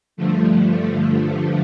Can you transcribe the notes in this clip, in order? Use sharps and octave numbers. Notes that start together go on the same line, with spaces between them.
G2 D3 F3 A3